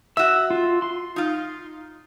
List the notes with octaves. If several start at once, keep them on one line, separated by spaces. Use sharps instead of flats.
F#4 E5 E6
F4
C6
D#4 F4